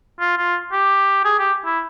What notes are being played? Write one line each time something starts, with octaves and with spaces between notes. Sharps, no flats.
F4
F4
G4
G#4
G4
E4